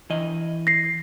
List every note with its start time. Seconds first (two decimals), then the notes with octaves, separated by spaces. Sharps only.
0.10 E3 D#5
0.67 A#6 C7